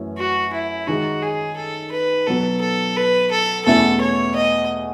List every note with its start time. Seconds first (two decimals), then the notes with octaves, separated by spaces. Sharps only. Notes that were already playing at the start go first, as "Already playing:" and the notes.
Already playing: F#2 E3 A3 C#4
0.18 F#4
0.53 E4
0.87 D#3 G#3 D#4 F#4
1.23 G#4
1.57 A4
1.92 B4
2.27 B2 F#3 B3 A4
2.62 A4
2.96 B4
3.32 A4
3.66 E2 B2 A3 C#4 E4 A4
4.01 C#5
4.36 D#5